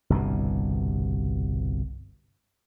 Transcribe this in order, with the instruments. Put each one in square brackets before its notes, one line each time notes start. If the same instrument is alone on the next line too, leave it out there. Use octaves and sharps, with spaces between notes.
[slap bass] G1 C2 G2 B2